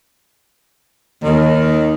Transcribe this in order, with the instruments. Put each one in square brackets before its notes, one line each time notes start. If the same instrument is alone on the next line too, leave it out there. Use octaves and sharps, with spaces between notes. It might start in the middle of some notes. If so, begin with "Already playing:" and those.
[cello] D#2 [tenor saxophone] D#3